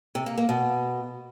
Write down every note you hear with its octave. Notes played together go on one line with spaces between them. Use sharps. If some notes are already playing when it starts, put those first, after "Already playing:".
C3
A#3
A#3
B2